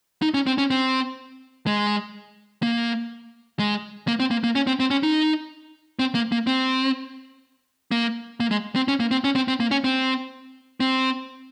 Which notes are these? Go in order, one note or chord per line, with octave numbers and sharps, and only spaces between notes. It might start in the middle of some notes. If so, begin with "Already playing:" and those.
D#4
C#4
C4
C#4
C4
G#3
A#3
G#3
A#3
C4
A#3
A#3
C#4
C4
C4
C#4
D#4
C4
A#3
A#3
C4
A#3
A#3
G#3
C4
C#4
A#3
C4
C#4
C4
C4
A#3
C#4
C4
C4